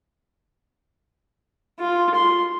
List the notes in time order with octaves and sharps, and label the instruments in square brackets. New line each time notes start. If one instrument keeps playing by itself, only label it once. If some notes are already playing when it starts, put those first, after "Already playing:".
[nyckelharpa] F4
C6